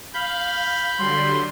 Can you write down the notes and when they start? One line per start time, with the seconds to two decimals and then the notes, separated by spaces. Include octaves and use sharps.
0.14 F5 B5 G6
0.98 D3 F#3 G3 C6